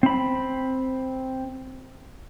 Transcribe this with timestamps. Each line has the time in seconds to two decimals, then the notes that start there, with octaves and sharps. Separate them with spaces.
0.03 C4 B5